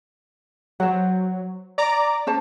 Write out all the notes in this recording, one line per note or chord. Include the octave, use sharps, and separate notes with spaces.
F#3 C5 F#5
D5 A#5 D6
C#4 C5 A5